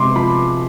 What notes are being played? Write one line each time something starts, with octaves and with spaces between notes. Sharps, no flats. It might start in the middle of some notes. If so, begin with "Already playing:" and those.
Already playing: C3 G#3 C6 D6
F3 B5